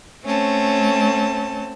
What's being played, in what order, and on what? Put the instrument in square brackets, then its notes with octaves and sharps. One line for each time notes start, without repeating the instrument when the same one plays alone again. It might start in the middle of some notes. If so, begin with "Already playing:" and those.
[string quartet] A3 C4 C#4 A5